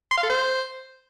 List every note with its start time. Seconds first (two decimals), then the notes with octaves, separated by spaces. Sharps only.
0.11 C6
0.17 F5
0.23 A4
0.30 C5